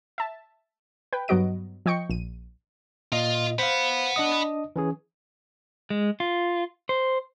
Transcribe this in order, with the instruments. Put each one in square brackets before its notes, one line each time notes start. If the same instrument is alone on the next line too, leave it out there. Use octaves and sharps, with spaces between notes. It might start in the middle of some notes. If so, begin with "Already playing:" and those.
[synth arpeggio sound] E5 A5
B4 G5
G2 F#3 B3 F#4 D#5 D7
F3 D#5 G5 C#6 C#7
A#1 D#7
[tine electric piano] A#2 D#5 [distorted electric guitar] F4
[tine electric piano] C5 F5 [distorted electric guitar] F#5 B5
[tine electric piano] D4 D#5 D#6
E3 C#4 G#4
[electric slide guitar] G#3
F4
C5